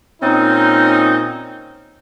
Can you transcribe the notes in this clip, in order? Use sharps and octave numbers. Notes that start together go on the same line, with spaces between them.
A#2 C4 C#4 D#4